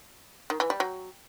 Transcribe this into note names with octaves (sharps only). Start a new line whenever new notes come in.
D#3
E3
G3
F#3